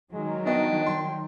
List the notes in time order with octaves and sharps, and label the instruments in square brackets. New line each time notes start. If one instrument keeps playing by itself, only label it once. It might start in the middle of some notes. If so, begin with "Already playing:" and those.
[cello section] D#3 F#3 [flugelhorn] G#3
[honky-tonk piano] B3 D#5 [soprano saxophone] D4 [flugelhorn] G5
[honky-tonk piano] C6